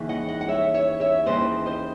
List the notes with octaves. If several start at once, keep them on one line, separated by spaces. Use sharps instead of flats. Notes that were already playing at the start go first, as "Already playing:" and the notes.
Already playing: D#2 C#3 E3
D#5 F#5
D#5 F#5
F#5
C#5 E5
C#5 E5
C#5 E5
D#2 C#3 E3 C5 D#5
C5 D#5